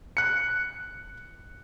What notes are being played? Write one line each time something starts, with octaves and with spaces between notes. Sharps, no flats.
F#6 C#7